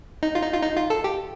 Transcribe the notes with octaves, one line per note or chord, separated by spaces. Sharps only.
D#4
F4
D#4
F4
D#4
F4
A4
G4